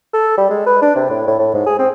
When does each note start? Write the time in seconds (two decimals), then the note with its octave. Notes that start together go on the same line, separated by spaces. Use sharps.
0.14 A4
0.38 G3
0.50 G#3
0.66 B4
0.82 D4
0.95 C3
1.10 A2
1.27 A2
1.39 A2
1.54 G#2
1.66 G#4
1.79 C4